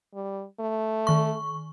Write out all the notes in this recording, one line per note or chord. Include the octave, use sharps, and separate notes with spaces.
G3
A3
D#3 C#6